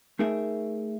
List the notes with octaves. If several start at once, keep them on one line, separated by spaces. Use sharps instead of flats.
A3 D#4 G#4 A#4 E5